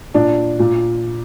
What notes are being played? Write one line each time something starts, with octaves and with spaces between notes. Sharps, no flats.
A#2 D4
A#2